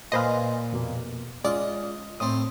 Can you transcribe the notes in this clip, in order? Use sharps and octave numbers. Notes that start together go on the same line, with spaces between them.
A#2 B4 C5 D#5 F5 G#5 C6
F2 B2 A#3
G#3 C#4 F4 D5 D#5
A2 C4 D#6